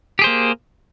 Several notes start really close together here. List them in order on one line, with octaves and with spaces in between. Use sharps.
G4 G#4 C5 A#3